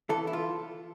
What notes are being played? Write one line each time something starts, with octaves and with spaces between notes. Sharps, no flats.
E3 A4
E4
F4